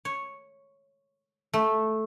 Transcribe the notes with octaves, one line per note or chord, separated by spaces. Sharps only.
C#5
A3